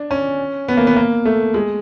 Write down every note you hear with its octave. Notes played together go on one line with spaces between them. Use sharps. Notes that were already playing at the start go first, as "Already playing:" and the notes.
Already playing: D4
C#4
B3
A#3
B3
A#3
A3
G#3